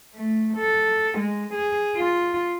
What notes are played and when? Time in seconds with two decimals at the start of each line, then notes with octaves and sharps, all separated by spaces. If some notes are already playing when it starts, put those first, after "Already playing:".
0.15 A3
0.57 A4
1.18 G#3
1.54 G#4
1.96 F4